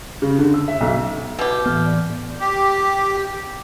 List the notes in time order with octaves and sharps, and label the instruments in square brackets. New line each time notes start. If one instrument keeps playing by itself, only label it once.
[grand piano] C#3
D3
E6
E5
B1
[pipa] B2 G4
[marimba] A2 E3 F6 [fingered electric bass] B3
[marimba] D5
[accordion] G4